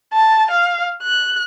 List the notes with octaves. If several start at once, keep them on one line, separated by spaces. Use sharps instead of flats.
A5
F5
F#6